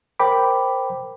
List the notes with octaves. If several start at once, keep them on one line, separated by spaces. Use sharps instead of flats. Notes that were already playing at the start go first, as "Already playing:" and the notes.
A#4 C5 G5 B5 D6